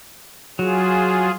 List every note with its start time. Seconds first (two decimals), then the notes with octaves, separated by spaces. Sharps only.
0.59 F#3 F4 G#4